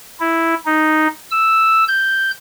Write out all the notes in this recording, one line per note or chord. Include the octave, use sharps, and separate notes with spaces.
E4
D#4
E6
G6